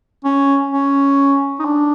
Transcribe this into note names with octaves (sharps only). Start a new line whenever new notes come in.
C#4
C#4
D#4
D4